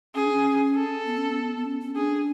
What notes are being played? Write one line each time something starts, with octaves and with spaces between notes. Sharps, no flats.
C#4 G#4
D4
C#4
A4
B3
C#4
B3
B3
C#4
C#4
D4 G#4